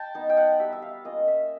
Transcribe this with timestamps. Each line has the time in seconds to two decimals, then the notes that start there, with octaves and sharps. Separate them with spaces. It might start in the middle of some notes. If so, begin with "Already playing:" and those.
Already playing: G5 A5
0.15 B3 D#4
0.30 G5
0.37 F#5
0.60 G3 E5
0.73 E5
0.82 F5
1.05 A#3 C#4 F4 D#5
1.28 E5